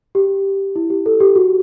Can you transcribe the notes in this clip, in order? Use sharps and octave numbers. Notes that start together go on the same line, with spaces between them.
G4
E4
G4
A4
G4
F#4